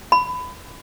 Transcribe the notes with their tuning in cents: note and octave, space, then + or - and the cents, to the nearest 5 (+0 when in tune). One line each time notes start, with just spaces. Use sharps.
B5 +20